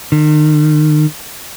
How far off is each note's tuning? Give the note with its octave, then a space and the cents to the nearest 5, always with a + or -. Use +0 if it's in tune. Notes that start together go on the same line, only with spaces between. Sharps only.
D#3 -35